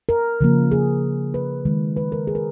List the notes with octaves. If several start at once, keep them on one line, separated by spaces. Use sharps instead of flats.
A#4
C#3 F3 A#3
G#4
B4
D#3 G#3
B4
A#4
G#4
A#4